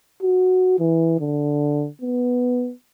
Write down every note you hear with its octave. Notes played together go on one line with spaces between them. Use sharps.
F#4
E3
D3
B3